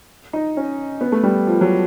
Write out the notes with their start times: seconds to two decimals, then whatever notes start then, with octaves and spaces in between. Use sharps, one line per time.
0.33 D#4
0.57 C#4
1.01 B3
1.12 A3
1.23 G3
1.47 F3
1.61 F#3